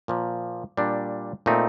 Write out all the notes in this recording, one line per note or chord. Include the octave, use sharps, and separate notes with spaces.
A#2 F3 A#3
A#2 G3 D4
A#2 A3 C4 D#4